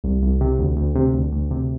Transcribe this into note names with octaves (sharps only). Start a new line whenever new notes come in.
C2
C2
C3
D2
D2
C3
D2
D2
C3